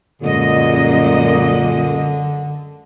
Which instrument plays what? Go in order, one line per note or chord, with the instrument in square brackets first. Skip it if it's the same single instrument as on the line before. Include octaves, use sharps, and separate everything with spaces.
[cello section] F#2 G#3 D#5 [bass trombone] A#2 [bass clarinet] D3